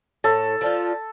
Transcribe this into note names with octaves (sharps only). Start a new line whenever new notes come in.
A2 A4
F3 D4 F4